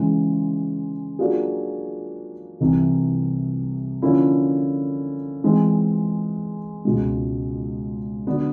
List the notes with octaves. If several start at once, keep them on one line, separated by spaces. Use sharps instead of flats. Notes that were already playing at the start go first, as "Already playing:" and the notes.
Already playing: C#3 E3 G#3
F#3 A#3 D4 F4 G#4
C2 C3 E3
D3 F3 A#3 C#4 E4
E3 G#3 C4
C#2 B2 G#3
D3 F#3 B3 D4